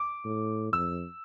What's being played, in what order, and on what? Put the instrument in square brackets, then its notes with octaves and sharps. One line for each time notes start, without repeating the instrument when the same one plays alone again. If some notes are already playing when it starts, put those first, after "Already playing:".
Already playing: [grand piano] D6
[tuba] A2
[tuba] F2 [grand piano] E6